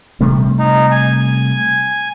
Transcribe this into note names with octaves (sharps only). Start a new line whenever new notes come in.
C3 G3 A3
D#4
G#5